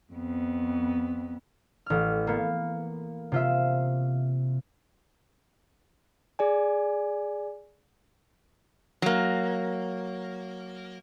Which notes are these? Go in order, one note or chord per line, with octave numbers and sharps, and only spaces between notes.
F2 B3
A1 F6
A#3 B3
C3 F4 E5
G#4 D5 G#5
F#3 A#3